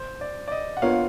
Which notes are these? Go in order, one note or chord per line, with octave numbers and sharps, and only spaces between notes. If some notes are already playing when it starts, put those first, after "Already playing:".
Already playing: C5
D5
D5
D#5
F#5
B3 D4 F4 A#4 C#5 F5